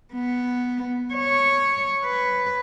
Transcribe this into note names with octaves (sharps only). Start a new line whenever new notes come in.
B3
C#5
B4